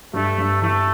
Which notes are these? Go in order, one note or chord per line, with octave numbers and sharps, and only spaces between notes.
G2 A3
G2
E3 A3